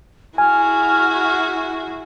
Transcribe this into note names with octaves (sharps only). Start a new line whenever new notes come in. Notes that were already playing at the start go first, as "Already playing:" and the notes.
E4 F#4 G#4 G#5 F6